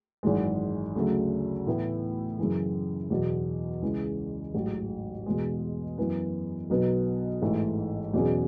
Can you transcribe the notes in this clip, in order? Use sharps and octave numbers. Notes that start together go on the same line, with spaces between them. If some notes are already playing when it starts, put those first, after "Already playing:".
G#1 F#2 E3 G#3
D2 C#3 F#3 A3
A2 E3 B3 E4
F#2 C#3 E3
E2 B2 F#3
C#2 C#3 E3 G#3
A1 G#2 F#3
E2 B2 G#3
F#2 E3 B3
B1 B2 F#3 B3
A1 G#2 E3 A3
E2 B2 F#3 C#4 G#4